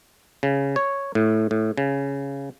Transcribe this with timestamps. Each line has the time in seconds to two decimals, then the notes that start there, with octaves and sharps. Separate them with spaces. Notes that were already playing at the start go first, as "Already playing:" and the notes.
0.43 C#3
0.76 C#5
1.15 A2
1.51 A2
1.78 C#3